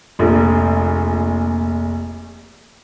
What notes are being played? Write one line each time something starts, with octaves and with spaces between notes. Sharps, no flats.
F1 A#1